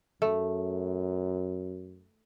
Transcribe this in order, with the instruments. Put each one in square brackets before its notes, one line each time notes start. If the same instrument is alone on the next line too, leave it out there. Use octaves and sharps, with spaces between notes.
[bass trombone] F#2 [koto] A3